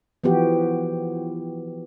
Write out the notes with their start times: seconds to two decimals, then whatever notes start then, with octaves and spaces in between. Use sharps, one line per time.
0.24 E3 F3 B3 F#4 G4